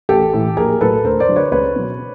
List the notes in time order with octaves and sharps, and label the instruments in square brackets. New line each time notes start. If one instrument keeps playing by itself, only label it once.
[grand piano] A1 G4 A4
A2 E3
A#1 G#4 A#4
A2 F#3 A4 B4
D2 A#4 C5
C5 D5
D3 F#3
B4 C#5
C#2 B4 C#5
B2 F#3